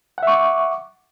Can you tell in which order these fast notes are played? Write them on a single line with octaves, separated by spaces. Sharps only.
F#5 E5 C#6 D6